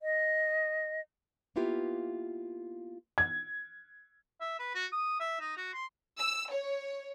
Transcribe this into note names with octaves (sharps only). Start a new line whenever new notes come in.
D#5
A#3 B3 E4 F4 G4
G#6
E5
B4
F#4
D#6
E5
D#4
F#4
C6
E6
C#5